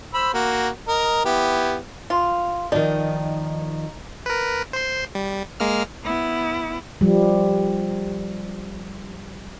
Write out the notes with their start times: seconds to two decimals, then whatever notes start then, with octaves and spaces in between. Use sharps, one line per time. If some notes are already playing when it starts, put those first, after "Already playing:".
0.14 C5 B5 E6
0.34 A#3 F#4
0.88 A#4 D#5
1.25 B3 E4 G4
2.10 F4
2.72 D#3 F3 D#4 D5
4.26 A#4 B4
4.73 C5 C6
5.15 G3
5.60 G#3 A#3 F6
6.04 B3 E4
7.01 F3 G3